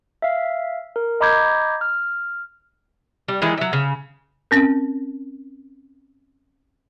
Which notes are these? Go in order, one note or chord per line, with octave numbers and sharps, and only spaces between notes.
E5 F5
A#4
D#5 A#5 B5 D6 G6 G#6
F6
G3
D#3 E3 G#3 E4
F#3 E5
C#3
C4 C#4 A#4